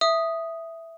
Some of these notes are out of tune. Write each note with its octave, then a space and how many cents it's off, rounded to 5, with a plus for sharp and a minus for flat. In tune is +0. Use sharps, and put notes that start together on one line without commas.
E5 +0 D#6 +0